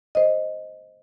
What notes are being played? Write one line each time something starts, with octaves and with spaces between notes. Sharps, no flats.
C5 D#5